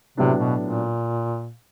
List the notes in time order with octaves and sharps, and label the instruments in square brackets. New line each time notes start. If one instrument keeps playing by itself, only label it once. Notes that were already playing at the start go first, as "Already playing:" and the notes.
[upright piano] A2 F#3 B3 D4 [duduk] C3
[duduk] B2
A#2